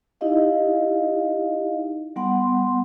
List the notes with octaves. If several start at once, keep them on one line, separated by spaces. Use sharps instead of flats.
D#4 E4 G4 D#5 F5
G3 B3 F#5 C6